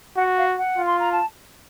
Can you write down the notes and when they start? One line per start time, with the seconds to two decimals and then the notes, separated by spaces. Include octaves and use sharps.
0.17 F#4 F#5
0.37 F5
0.57 F#5
0.78 F4
0.86 C6
0.99 A#5
1.12 A5